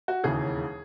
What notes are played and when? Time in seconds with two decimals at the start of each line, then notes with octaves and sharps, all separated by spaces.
0.08 F#4
0.24 E1 D#2 C#3 E3 G#4